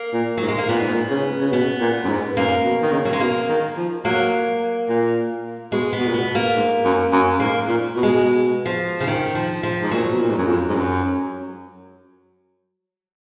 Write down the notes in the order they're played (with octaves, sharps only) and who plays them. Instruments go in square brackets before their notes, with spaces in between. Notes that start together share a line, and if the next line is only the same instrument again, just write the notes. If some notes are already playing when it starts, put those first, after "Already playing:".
Already playing: [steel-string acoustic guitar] A#3
[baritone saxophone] A#2
[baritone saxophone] G#2 [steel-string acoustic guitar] F#3
[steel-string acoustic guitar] G#3
A#3
[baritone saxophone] A#2 [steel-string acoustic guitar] B3
[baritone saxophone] G#2
A#2
C#3
C#3
[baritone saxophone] B2 [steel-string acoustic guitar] B3
[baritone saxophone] A#2
F#2
G#2
[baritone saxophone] F#2 [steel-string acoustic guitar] A#3
[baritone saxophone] B2
D#3
C#3
[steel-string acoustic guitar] F#3
G#3
[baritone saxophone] B2 [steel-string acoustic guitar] A#3
[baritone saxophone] D#3
F3
[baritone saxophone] F#3 [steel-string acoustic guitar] A#3
[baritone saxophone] A#2
[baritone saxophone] B2 [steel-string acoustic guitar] G#3
[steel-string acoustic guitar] B3
[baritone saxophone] B2
A#2
[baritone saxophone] B2 [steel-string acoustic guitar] B3
[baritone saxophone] B2
[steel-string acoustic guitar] A#3
[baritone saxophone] G#2
F#2
F#2
[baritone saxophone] G#2 [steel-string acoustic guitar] A#3
[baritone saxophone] A#2
B2
[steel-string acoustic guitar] G#3
F3
C#3
D#3
F3
F3
[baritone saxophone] G#2
[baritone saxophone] A#2 [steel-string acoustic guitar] F#3
[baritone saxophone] B2
A#2
G#2
F#2
F2
G#2
F#2